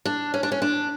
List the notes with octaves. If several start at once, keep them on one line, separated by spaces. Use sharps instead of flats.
D4
C#4
D4
C#4
D4